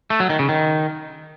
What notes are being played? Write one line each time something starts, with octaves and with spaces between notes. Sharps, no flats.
A3
F#3
D#3
C#3
D#3